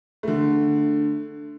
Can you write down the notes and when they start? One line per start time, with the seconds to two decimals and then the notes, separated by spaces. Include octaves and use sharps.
0.23 D3 A3